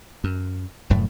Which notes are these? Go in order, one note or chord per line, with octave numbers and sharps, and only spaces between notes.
F#2
F1 F#2 A2 A3